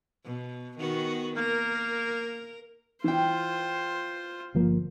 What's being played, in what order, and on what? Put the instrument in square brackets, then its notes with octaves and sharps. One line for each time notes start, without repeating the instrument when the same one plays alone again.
[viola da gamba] B2
D#3 B3 F#4
[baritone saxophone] A#3 [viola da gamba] A#4
[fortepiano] E3 G5 [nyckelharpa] F4 C5
[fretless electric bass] G1 F3 A#3